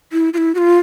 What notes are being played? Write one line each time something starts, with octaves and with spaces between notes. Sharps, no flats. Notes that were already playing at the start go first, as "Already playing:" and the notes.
E4
F4
E4
F#4
F4